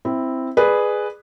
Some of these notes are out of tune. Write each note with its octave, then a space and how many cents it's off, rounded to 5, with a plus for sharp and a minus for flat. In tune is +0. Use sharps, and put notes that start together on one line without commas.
C4 +0 E4 +0
G#4 +0 B4 +0 D5 +30